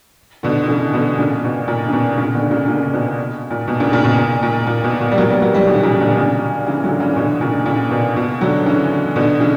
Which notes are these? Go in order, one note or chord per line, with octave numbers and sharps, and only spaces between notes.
B2 D3
D3
C#3 E3
B2 D3
A#2 C#3
B2
A#2
C#3
B2
A#2 C#3
B2 D3
A#2 C#3
A#2 C#3
B2
A#2
B2
A#2 C#3
A#2 C#3
B2
A#2
A#2
A#2
B2
B2
G3
F#3 A#3
G3 B3
F#3 A#3
E3 G3
B2 D3
A#2 C#3
B2 D3
A#2 C#3
C#3 E3
D3 F#3
C#3 E3
B2 D3
A#2 C#3
A#2 C#3
B2
B2
D3 F#3
C#3 E3
B2 D3
C#3 E3